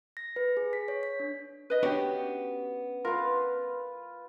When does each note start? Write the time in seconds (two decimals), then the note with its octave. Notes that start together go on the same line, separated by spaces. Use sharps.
0.17 A#6
0.36 B4
0.57 G#4
0.73 B6
0.88 C#5
1.03 B6
1.20 D4
1.70 B4 D#5
1.83 B3 C#4 D4 F#4 G4
3.05 F4 A#4 B4